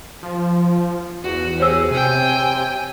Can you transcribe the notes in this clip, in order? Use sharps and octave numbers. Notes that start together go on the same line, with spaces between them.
F3
E2 F#4
G4 G#4 C5 C#5 E6
C3 G5 G#5